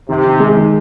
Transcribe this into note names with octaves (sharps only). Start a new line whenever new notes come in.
C3 D#3
D#3
G#3
D#3